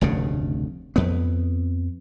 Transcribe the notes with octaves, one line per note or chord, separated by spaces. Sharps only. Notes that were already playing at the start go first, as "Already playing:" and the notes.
F1 D2 G2 C#3
F2 B3